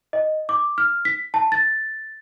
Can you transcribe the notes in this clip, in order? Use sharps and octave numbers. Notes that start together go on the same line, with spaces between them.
D#5
D6
F6
B6
A5
A6